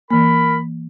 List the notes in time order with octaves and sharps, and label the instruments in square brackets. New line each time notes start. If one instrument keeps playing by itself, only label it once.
[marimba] E3 A#3 [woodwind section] A#4 B5